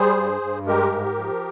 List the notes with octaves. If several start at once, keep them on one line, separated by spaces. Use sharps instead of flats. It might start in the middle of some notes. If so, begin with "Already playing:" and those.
Already playing: G3 G#4 C5
G2
G2
G#3 G4 A#4
G#2
F3